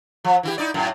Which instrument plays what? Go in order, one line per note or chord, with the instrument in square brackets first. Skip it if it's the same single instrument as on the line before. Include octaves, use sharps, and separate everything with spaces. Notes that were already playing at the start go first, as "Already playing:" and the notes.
[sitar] F3
E3 E4 G4
D#4 E4 D5
F#2 A2